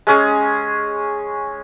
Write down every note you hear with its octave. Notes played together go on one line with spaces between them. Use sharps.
G#3 C#4 G#4